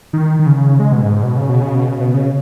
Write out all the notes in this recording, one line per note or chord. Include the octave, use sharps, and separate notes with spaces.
D#3
D#3
C#3
G#3
B2
G#2
B2
C#3
B2
C#3
B2
C#3
B2
C#3